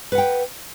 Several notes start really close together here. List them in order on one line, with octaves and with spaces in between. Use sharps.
B4 F#5 G5